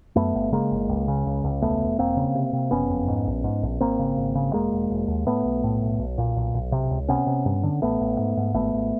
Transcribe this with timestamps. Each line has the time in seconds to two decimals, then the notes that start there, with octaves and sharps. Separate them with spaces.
0.16 F#2 A3 B3
0.35 G1
0.52 C#3 G#3 A#3
0.71 G1
0.89 C#2
1.08 C#3
1.26 C#2
1.44 C#2
1.62 E1 A3 B3
1.80 E1
1.98 E1 A#3 C4
2.17 C#3
2.35 C3
2.53 C3
2.71 F#1 B3 C#4
2.90 F2
3.08 G#2
3.27 A#1
3.44 G#2
3.62 A#1
3.81 G#1 A#3 C4
3.99 C#3
4.17 G#1
4.35 C#3
4.53 E1 G#3 A#3
4.72 E1
4.90 E1
5.08 D#2
5.27 A2 A3 B3
5.45 B1
5.64 A2
5.82 B1
5.99 B1
6.18 A#2
6.36 B1
6.54 B1
6.72 C3
6.91 C#2
7.09 C3 B3 C#4
7.27 C3
7.46 G2
7.63 D3
7.82 A1 A3 B3
8.00 A1
8.19 G#2
8.37 G#2
8.54 G#1 A3 B3
8.73 G#1